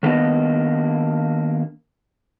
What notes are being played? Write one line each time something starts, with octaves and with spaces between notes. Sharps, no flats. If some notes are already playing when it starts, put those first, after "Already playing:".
D#3 A#3 B3 D4 D#5